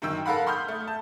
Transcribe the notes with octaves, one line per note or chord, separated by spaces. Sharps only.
F#2 D#3 G5 E6
A4 A#4 F5 F#5 B5
B5 C6 D#6 F6 G6
A3
A5